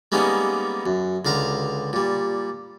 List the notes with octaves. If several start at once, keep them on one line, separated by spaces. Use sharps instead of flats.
G3 G#3 A#3 B3 C#4 D#4
F#2
C#2 D3 F5 A#5
A#2 G3